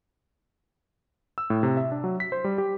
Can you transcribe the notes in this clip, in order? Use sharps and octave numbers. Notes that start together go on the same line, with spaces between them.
E6
A2
C3
E5
D4
F#3
B6
C5
G3
G4